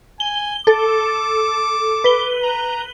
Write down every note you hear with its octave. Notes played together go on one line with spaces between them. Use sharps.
G#5 G7
A4 D6
B4 G7
A#5